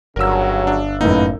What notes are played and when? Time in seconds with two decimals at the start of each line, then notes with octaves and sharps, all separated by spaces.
0.16 G1 G2 C#3 F#3 A#4 E6
0.67 D4
1.01 F#2 A2 A#3 D#4 B4